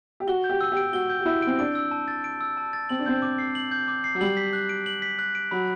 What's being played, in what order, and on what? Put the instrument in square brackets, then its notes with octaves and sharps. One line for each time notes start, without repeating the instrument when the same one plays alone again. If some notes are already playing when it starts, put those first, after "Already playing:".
[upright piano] G4
[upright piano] F#4 [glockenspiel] G7
[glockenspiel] G6
[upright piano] G4
[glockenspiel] E6
[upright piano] G4 [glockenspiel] D7
[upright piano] F#4 [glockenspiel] G7
[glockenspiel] G6
[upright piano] F#4
[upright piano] E4 [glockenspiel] E6
[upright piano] C4 [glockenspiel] D7
[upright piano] D4 [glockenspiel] D7
[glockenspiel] E6
A5
A6
D7
E6
A5
A6
[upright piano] C4 [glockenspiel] F#7
[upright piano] D4
[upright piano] C4 [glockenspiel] G6
[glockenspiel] D6
C7
F#7
G6
D6
C7
[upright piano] F#3
[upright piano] G3 [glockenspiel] F#7
[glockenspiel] B6
F#6
D7
F#7
B6
F#6
D7
[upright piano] F#3 [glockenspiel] B5